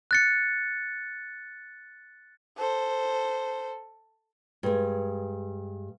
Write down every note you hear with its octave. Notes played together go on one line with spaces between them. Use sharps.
F#6 A6 C#7
A4 C5
G2 G#3